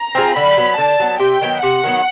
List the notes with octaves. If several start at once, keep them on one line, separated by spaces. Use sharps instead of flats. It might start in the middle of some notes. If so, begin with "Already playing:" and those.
Already playing: A#5
C4 F4 G#4
D3 B5
F#3 B3
D3 A5
F#3 B3
C3 G5
D#3 F#3 B3
C3 F#5
D#3 F#3 B3